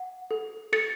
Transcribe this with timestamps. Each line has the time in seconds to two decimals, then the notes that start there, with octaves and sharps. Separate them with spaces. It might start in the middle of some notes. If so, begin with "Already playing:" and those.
Already playing: F#5
0.31 A4
0.73 A4 A6 C#7